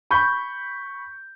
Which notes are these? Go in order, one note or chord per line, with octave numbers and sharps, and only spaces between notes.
B5 C#6 G6